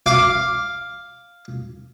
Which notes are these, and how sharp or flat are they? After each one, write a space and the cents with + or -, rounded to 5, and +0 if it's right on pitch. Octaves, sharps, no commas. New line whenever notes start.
F5 +0 D6 +0